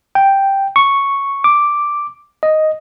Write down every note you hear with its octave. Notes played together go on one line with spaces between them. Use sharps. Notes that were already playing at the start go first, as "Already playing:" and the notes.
G5
C#6
D6
D#5